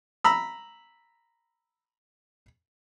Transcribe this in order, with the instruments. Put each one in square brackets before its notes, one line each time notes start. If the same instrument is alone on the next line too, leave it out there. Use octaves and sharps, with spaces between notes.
[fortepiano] A#5 B5 E6